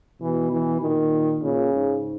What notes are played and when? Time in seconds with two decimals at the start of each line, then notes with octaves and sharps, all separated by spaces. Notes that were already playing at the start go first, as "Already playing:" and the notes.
0.22 B2 E3
0.52 E3
0.81 A#2 D#3
1.42 A#2 C#3
1.73 G#2